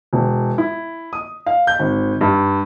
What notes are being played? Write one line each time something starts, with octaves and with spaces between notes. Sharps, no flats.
E1
E4
D#6
F5
G6
G#1
G2